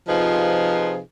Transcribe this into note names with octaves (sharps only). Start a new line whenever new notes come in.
C3 F3 D#4 F4 G#4 B4